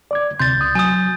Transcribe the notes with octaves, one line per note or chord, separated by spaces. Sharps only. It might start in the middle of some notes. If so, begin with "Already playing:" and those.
D5 D6 G#6
D2 C3 C6 G6 A6
C#2 D#6
F#3 G#5 D#6